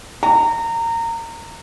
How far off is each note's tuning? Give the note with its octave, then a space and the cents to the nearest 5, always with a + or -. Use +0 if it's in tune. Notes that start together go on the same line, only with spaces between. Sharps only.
A#5 -25